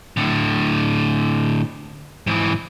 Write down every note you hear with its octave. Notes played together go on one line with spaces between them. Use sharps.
A2 D3
G#2 E3